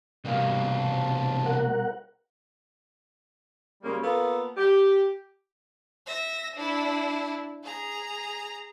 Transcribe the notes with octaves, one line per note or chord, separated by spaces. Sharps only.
C2 B2 G3 A#3 F5
C5 A5
A#4 F#5
F#2 C#3 G3 G#3 A#3 C#4
A#3 B3 F4 A4
G4
E5 A#6
D4 E4
G#4 A#5